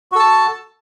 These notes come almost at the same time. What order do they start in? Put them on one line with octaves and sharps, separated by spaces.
F#4 A4 A5